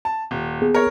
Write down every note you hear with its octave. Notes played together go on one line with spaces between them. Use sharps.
A5
D#1
B3 G#4
A#4 C#5